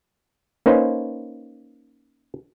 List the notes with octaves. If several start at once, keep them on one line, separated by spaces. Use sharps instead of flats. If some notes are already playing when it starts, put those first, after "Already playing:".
A#3 C#4 D#4 B4 C5